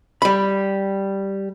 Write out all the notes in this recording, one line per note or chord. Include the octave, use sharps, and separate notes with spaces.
G3 B5